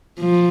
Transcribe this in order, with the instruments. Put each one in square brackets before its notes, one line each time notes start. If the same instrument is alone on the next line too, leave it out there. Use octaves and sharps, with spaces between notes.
[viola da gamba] F3